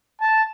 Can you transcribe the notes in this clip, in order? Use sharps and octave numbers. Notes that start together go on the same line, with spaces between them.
A5